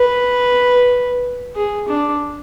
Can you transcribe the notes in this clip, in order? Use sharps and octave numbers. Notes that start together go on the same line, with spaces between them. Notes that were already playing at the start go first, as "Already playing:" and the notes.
Already playing: B4
G#4
D4